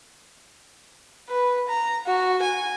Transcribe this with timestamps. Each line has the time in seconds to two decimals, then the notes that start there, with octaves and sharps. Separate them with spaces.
1.28 B4
1.68 A#5
2.06 F#4
2.42 G#5